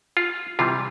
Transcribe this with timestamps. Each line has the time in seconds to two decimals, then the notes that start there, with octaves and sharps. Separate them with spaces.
0.17 F4
0.59 C3 E3 G3 F4